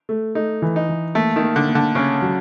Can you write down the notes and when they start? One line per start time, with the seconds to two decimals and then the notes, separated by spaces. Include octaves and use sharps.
0.09 A3
0.35 A3 D#4
0.62 E3
0.76 D#4
0.89 E3
1.15 A3 A#3
1.36 D#3
1.42 A#3
1.56 D3
1.69 A#3
1.75 D3
1.95 C#3 C#4
2.22 F#3